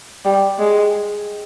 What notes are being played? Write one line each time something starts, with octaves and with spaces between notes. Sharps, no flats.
G3
G#3